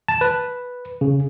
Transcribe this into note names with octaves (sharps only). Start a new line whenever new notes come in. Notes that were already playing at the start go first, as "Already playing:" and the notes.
A5
B4
C#3